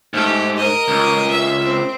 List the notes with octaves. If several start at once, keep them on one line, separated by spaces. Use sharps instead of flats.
G#2 A3 G4
A#4 D#5
C#2
E5
C4